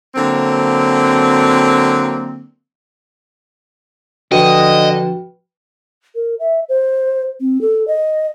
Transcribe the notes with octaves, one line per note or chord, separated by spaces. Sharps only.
D3 F#3 A#3 C4
D3 F3 F#4 B4 D#5 G5
A#4
E5
C5
C4
A4
D#5